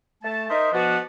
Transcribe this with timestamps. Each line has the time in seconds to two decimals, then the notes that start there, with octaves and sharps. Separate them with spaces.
0.23 A3 A5
0.49 D#4 A#4 C5 D#5 E5
0.72 B2 F3 B3 D4 F#4